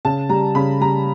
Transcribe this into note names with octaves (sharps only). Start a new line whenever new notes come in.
C#3 A5
G3 A#5
C#3 B5
G3 A#5